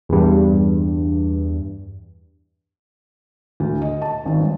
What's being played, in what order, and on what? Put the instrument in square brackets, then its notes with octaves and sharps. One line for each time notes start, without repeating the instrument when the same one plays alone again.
[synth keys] E2 G2
[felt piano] D2
D#5
A5
G#1
G1